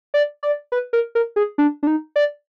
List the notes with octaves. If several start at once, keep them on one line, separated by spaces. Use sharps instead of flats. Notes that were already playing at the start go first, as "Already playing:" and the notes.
D5
D5
B4
A#4
A#4
G#4
D4
D4
D#4
D5